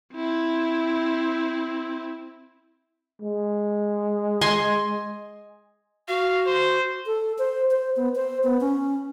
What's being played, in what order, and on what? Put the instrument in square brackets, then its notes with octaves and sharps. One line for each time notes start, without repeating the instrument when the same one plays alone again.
[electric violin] C4 E4
[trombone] G#3
[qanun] D#5 G#5 C6
[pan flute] F#4 [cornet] F5
[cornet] C5
[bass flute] A4
C5
C5
B3
C5
B3
C#4